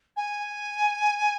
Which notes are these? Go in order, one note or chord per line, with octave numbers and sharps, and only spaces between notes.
G#5